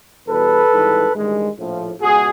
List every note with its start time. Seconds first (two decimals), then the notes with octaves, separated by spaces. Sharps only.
0.28 E2 B2 G3 A4 B4
0.72 G#1 G#2 E3 G3
1.14 A1 G2 D#3 G#3
1.57 A#1 A2 F3
2.01 C#2 B2 G#3 F#4 G#4